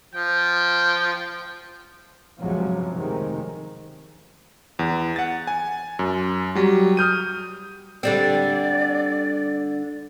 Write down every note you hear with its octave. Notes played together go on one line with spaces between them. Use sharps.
F3 G5
C#2 G2 C3 F3 F#3
F1 C3 D#3 G#3
E2
F#5 A6
G#5
F#2
F#3 G3
D#6 F6 G6 D#7
D3 G3 C4 D5